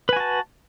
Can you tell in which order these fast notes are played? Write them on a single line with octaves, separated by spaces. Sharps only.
B4 G#5 F#4 A5